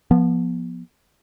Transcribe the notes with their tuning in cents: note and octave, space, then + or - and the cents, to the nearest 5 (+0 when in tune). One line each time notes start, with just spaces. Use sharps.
F3 +5 B3 -30